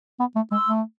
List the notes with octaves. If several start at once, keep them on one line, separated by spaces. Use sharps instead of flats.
B3
A3
G#3 C6 E6
A3